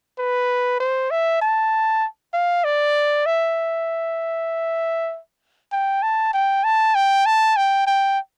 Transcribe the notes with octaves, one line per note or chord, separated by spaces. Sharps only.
B4
C5
E5
A5
F5
D5
E5
G5
A5
G5
A5
G5
A5
G5
G5